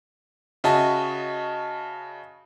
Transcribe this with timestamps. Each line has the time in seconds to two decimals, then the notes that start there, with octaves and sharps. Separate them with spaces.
0.64 C#3 F#4 D#5 E5 A5